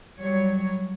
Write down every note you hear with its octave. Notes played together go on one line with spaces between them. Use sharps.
F#3 G3 C#5